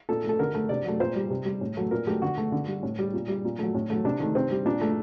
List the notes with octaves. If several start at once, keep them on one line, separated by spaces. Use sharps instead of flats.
A#2 A4
A3
A4
D3 A#4
A3
C3 D5
F#3 A3
A#2 C5
G3
C3
G3
A2
F#3 A3
A#2 A#4
F#3 A3 G4
D3 F#4
A3
D3
G3
A2
G3
A#2
G3
A#2
F#3 A3
A2
F#3 A3
C3 D4
D#3 A3
C3 C4
G3
A#2 D4
A3